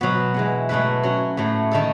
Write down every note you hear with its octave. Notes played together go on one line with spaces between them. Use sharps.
B2 F#3 B3 F#4
E3 G#3 B3
B2 F#3 A3 E4 B4
F#3 C#4 F#4
A2 F#3 A3
D#3 A3 D#4 A4